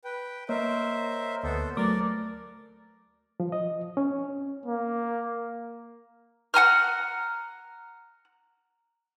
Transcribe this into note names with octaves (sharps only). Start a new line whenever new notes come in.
B4 G5
A#3 A#4 C5 C#5 D#5 E5
D2 B3 A4 C5
F#3 A3 A#4 D5 D6
F3
D#5
C#4
A#3
F#5 G#5 A#5 F6